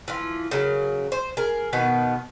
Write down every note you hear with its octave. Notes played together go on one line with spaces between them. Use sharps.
E3 F3 F4
C#3 F#3 A#4
C5
G#4 A#4
B2 D#3 B3